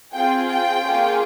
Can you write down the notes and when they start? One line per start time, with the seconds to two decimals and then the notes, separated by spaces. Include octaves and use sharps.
0.14 C4 F4 G#4 G5
0.48 G5
0.82 A#3 C#4 F4 G#4